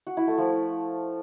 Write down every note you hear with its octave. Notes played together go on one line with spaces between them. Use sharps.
F#4
E4
A3
F3